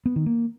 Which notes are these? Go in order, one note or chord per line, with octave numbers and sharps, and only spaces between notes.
B3
D#3
A#3